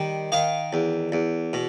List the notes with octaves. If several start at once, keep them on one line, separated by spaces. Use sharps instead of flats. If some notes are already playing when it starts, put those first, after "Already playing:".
Already playing: D#3 G3
D#3 D#5 F5
E2
E2
B2